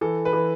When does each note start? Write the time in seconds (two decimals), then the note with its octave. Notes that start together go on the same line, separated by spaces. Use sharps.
0.01 E3 A4
0.25 B4
0.33 E3